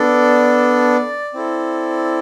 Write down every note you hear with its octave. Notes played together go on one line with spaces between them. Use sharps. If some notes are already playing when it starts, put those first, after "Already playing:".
Already playing: B3 D4 A4 D5
C4 E4 A4